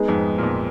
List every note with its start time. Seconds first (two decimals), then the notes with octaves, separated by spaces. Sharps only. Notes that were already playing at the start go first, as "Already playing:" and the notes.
Already playing: G#3 B3 D#4 G#4
0.08 F2 G#2
0.38 A#2
0.43 F2 G#2